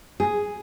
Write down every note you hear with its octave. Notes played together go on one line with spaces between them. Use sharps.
G#4